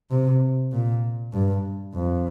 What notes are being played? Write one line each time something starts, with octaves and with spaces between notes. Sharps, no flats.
C3
A#2
G2
F2